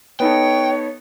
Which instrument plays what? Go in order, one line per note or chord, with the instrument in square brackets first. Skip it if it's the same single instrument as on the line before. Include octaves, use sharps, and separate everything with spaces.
[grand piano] B3 D#4 A4 [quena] C#5 [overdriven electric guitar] G5